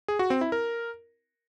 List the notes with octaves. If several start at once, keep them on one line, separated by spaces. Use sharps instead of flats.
G#4
F#4
C4
E4
A#4